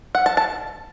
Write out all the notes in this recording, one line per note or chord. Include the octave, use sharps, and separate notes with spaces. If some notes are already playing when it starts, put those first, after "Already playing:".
F#5
A5
A5